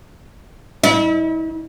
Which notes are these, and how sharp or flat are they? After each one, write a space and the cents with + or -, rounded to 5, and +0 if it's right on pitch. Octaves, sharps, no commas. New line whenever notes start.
E4 -40